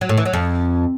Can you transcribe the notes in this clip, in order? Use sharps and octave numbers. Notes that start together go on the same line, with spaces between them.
F#3
A2
E3
F#3
F2